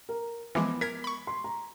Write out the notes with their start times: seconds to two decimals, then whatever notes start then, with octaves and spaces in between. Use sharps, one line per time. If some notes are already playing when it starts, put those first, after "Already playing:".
0.09 A#4
0.55 E3 F3 G#3 B3 D6
0.81 A#4 G#6 B6
1.04 B5 C#6
1.27 C6
1.44 A#5